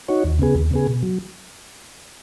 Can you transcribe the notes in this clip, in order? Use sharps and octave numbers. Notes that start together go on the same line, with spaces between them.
D#4 F#4 C#5
D#2
C#3 B3 G#4
D#2
C#3 B3 G#4
B2
F#3